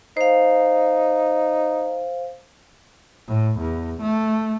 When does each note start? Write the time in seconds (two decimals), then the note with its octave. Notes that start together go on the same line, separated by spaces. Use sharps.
0.17 D#4 C5 F5
3.27 A2
3.59 E2
4.01 A3